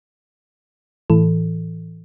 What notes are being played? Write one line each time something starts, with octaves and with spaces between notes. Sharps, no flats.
A2 E3 A4